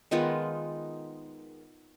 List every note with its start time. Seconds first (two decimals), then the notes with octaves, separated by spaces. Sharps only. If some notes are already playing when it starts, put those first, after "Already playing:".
0.11 D#3 G#3 B3 D#4 F4